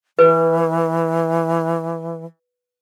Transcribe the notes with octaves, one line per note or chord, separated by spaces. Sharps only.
E3 B4